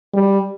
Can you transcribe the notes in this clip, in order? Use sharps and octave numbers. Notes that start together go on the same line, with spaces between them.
G3